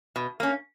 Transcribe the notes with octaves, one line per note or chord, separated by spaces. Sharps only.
B2
A#3 C#4